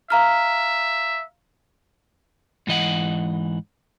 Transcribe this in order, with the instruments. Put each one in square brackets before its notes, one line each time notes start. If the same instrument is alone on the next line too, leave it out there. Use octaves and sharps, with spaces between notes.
[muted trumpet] E5 [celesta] F5 A#5 F6
[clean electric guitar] G#2 E3 D#5 F#5